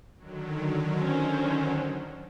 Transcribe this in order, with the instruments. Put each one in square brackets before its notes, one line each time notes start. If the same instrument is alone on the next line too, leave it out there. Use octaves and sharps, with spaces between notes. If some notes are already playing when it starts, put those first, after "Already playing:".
[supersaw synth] D3 D#3 F#3
[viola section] C#4 C5